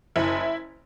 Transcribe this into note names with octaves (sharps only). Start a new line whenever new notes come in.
F#1 E4